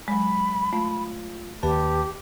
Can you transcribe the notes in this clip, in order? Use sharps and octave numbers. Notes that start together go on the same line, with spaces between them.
F#3 G#3 B5
A3 F4
D#2 G4 B4 A5